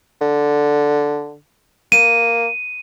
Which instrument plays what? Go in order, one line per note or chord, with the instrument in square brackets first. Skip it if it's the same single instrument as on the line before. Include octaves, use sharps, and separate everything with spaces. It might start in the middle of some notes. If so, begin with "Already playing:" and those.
[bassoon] D3
[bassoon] A#3 [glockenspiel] D#7